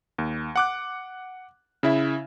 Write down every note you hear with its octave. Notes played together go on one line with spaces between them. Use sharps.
D#2
F#5 D6 F#6
C#3 E4 E5